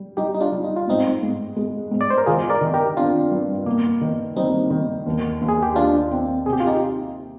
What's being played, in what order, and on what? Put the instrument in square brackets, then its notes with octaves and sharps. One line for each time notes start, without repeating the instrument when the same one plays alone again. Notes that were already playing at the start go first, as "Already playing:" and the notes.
Already playing: [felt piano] G3
[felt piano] G3 [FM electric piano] D#4 G4
[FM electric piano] D#4
D4 F4
[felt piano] G3
[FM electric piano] D#4
F4
[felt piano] G#2 [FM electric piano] C4 D#4
[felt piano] G#2
G#3
G#2
[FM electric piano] D5
C5
A#4
[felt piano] D#3 [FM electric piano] F4 G#4
[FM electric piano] A#4 D5
[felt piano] D#3
[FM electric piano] G4 A#4
[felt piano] C4 [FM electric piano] D4 F4
[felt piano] G2
A#3
D#3
[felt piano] G3 [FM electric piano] C4 D#4
[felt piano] D#3
D#2
D#2
[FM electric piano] G#4
G4
[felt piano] D#2 [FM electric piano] D4 F4
[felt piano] C4
[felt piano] C3 [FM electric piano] G#4
[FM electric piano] G4
F4
D#4 G4